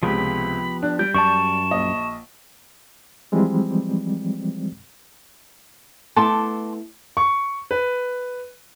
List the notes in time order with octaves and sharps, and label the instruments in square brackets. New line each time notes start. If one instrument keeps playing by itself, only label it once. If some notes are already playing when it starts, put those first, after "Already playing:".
[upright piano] C#2 C3 [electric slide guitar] F3 B3 G4 [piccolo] B5
[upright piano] D4 [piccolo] F#6
[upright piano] G3 [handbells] G6 [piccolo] D7
[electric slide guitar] F#2 D5 [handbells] A5 C#6 [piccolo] E7
[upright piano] A#1 D#5
[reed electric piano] E3 F3 G3 G#3 C4
[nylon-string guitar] A3 B3 E4 [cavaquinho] A5 C6 D6
[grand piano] C#6
B4